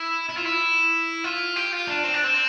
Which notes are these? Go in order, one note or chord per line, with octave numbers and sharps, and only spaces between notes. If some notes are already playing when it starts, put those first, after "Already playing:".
Already playing: E4
E4
F4
E4
F4
G4
F4
D4
C4
D4
C4